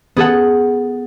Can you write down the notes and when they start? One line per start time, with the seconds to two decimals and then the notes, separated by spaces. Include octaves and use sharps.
0.16 B3 G#4 A4 F#5